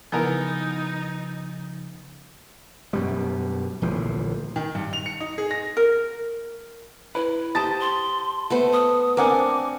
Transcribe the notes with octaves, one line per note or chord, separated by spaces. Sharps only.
C#3 E3 F3 B3 D#4 A#4
F#2 B2 G3
D1 A#1 E3 F3
D#3
G2
F7
C#7
D#4
G#4
A#6
A#4
E4 B4
G4 C5 A5 D#6 A6
C6
A3 B3 C5
D#6
C4 D4 A#4 F#5 G#5 D6